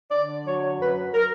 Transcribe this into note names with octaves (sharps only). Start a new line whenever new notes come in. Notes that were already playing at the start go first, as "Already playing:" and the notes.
D3 D5
F#3 C#5
F#2 B4
A#4